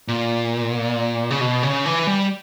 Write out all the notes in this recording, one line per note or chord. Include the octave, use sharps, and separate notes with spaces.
A#2
C#3
B2
C#3
E3
G3